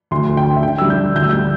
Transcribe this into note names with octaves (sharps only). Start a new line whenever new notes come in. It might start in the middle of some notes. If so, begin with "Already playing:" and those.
D2 C6
D2
G5
D2
E5
D3 G5
G3 E6
G6
D3
D2 G6
E6
G3 G6